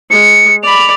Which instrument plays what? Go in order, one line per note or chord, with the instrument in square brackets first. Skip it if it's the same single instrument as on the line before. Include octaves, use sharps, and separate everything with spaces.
[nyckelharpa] G#3 [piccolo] C#7
[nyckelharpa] D5 B5 [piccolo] F7